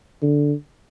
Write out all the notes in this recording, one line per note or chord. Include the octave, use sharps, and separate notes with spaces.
D3